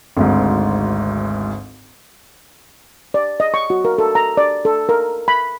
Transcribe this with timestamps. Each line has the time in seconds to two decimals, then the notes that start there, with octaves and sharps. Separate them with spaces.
0.17 G#1 D2 G#2
3.14 D5
3.40 D#5
3.54 C#6
3.70 F#4
3.85 A#4
3.98 A4
4.15 A#5
4.37 D5
4.65 A4
4.89 A#4
5.28 B5